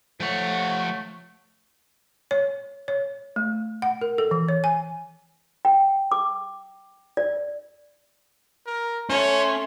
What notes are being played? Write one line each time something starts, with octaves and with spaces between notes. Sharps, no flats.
F3 A3 C#5 F#5
C#5
C#5
A3
F#5
A#4
A4
E3
C#5
G#5
G5
D6
D5
A#4
A3 C#4 C#5 C6